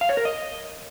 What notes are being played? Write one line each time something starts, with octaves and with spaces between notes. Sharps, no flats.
F5
C#5
A#4
D#5